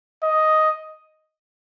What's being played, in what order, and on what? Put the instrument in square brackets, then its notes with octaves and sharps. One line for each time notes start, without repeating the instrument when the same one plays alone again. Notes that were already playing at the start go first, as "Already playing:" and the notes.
[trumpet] D#5